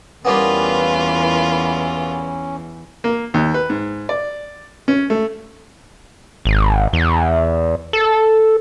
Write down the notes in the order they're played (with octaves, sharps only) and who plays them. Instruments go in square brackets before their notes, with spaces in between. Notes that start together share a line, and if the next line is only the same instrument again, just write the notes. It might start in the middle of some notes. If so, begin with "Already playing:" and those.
[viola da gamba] E2 E3 [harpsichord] G3 A#3 B3 [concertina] C#4 [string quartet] F4 B4
[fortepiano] A#3
D#2
B4
G#2
D5
C#4
A3
[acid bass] G#1
E2
A4